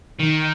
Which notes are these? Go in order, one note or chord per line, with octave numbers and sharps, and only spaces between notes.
D#3